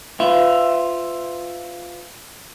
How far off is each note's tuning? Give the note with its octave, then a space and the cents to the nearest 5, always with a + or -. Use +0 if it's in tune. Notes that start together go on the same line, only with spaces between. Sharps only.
F4 +0 B4 +40 E5 +10